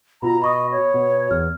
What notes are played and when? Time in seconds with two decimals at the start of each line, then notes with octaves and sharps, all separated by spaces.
0.22 B2 F4 A#5 B5
0.42 D#5 B5 C#6 D#6
0.71 C#5
0.94 B2
1.31 E2 F6